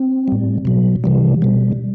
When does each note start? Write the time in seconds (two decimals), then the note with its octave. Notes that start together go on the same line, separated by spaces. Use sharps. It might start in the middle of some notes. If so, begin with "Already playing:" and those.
Already playing: C4
0.28 A2 G3
0.65 B2 F#3
1.04 C3 E3 G3
1.42 B2 G3